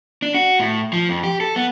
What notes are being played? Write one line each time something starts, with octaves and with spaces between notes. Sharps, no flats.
D4
F#4
A2
F3
F2
G4
A4
B3